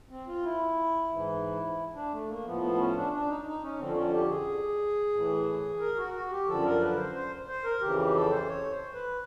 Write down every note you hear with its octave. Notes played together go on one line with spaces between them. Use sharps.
C4
F4
E4
G#2 E3
D4
A3
A#3
A2 F3 B3
B3
C#4
D4
D4
D#4
D#4
C#4
F2 D3 F3 C4
C#4
G4
G#4
A2 E3
A#4
F#4
F#4
G4
F#2 D3 F3 A4
A#4
B4
C5
C5
C5
A#4
F2 C#3 E3 G4
G4
A4
C5
C#5
C5
B4